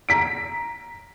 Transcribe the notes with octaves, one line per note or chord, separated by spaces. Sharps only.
A#5 B6 D7